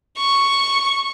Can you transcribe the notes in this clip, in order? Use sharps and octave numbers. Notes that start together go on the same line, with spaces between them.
C#6